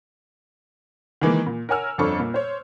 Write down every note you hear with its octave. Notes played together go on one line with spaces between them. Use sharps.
D#3 E3 G#3 A#3
A#2
A#4 C#5 F#5 G#5 E6 F6
G1 F2 C4 D4 A4 C#6
A#2
C5 C#5